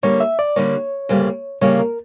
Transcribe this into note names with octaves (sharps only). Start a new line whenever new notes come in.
D3 G3 A#3 C#5
E5
D5
D3 G3 A#3 C#5
D2 C#3 G3 A#3
D2 C#3 G3 A#3 C#5
A#4